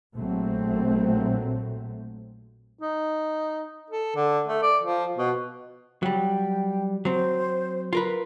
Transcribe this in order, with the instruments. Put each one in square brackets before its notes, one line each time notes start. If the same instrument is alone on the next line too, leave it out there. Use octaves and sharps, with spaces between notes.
[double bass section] A#1 A#2 F#3 A3 C4
[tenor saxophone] D#4
A4
D3
A3
D5
F3
B2
[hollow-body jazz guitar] F#3 G3 [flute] G5
[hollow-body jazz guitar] F#3 C4 [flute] C5
[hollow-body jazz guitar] F4 A#4 B4